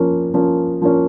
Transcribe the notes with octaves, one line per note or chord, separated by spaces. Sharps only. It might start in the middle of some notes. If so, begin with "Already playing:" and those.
Already playing: F3 A#3 C#4
F3 A#3 C#4
F3 A#3 C#4